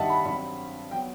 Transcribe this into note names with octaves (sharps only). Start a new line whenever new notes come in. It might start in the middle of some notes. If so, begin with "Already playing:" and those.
Already playing: G2 D#3 G3 D#4 D#5 E5 F#5 A5
B5
G2 F#3 C4 B5
F#3 B3 G5